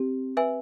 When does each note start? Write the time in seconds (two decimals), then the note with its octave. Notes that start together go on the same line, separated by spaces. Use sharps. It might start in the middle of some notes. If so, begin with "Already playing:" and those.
Already playing: C4 G4
0.37 B4 E5 G#5